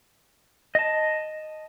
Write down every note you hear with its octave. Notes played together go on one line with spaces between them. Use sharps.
D#5 A5